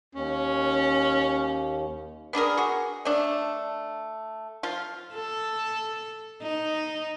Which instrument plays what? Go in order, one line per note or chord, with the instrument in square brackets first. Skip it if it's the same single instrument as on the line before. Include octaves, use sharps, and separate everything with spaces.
[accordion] D#2 [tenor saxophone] C#4
[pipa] B3 D4 G#4 A#4
F#4 G#4
A3 D4
F3 F4
[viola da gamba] A4
D#4